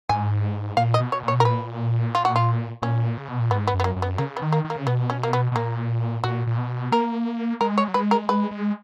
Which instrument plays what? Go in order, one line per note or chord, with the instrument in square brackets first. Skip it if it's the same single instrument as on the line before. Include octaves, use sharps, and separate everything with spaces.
[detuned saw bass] G#2 [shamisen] G#5
[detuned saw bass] A#2 [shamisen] F5
[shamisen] D#5
[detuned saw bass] B2
[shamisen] C#5
[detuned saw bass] A#2
[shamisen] C#5
[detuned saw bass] B2
[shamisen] A#4
[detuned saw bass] A#2 [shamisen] B4
[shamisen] F4
F#4
F4
[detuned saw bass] A#2 [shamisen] C#4
[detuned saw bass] C#3
B2
A#2
[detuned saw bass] G#2 [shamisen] B3
[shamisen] B3
[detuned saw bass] F#2
[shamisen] B3
A#3
[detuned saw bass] F#2
[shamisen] B3
[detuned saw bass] C#3 [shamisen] A#3
[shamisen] B3
[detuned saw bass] D#3
[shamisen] A#3
[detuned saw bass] D#3
[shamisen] A#3
[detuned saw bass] C#3
[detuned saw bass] B2 [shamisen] B3
[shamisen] C#4
A#3
B3
[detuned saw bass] B2
[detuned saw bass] A#2 [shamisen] A#3
[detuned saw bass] A#2 [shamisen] F#4
[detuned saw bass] A#2
B2
[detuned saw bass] A#3 [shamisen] A#4
[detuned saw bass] G#3 [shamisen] A#4
[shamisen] C#5
[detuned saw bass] F#3
[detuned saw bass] G#3 [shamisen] B4
[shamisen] A#4
[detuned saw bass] G#3 [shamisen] B4
[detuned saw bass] G#3